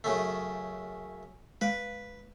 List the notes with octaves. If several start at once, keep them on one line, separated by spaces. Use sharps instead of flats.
F#2 C#3 A3
G#3 B4 F5